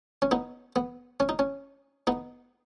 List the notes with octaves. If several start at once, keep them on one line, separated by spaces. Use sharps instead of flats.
C#4
B3 D#4
B3
C#4
D#4
C#4
B3 D#4